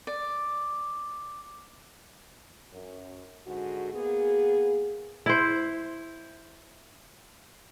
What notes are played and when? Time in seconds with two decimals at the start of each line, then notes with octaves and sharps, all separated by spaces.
0.07 D5
2.73 F#2
3.46 G#2 D3 F#4
3.93 A#3 B3 G#4
5.26 E4 C5